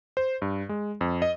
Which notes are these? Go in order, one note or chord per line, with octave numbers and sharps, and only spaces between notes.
C5
G2
G#3
F2
D#5